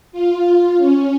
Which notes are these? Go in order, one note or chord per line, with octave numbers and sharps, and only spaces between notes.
F4
C#4